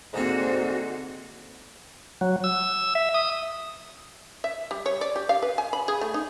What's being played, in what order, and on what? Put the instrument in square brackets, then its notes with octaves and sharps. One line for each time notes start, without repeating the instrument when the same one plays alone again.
[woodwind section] C2 G#2 [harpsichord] D3 C4 [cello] A#3 F#4
[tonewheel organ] F#3
E6
E5
D#6
[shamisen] E5
G3
C#5
D5
G4
F5
B4
G#5
B5
G#4
A3
D#4